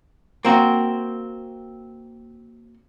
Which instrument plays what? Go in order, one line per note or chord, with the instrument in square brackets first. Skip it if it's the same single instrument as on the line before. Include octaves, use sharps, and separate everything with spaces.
[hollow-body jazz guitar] A#3 C4 F#4